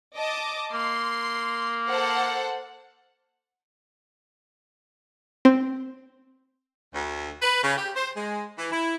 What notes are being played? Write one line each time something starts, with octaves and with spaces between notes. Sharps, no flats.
D#5 A5 D6
A#3 C6
A4 C5 F#5
C4
D2
B4
C#3
G4
C5
G#3
E3
E4